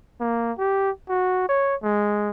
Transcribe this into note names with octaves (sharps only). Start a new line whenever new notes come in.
A#3
G4
F#4
C#5
G#3